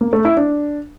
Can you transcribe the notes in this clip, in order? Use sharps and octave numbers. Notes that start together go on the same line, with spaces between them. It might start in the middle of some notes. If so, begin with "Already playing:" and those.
A#3
A3
E4
D4